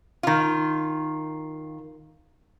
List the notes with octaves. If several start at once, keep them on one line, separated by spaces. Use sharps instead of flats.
D#3 F4